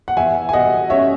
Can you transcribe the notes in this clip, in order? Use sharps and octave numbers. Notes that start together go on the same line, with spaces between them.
F#5
E2 E5 G#5
G#5
B2 D#5 F#5
C#4 C#5 E5